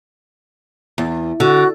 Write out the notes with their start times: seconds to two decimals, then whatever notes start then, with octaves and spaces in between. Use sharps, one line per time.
0.98 E2
1.40 D3 F#4